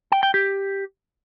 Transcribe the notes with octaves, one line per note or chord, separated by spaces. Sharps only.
G5
G5
G4